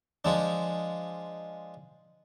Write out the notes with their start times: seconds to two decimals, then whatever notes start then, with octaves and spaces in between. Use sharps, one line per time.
0.25 F3 G#3 D4